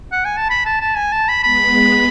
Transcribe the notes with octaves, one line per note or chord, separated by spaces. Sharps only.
F#5
G#5
A5
B5
A5
A5
G#5
A5
B5
G#3 B3 B5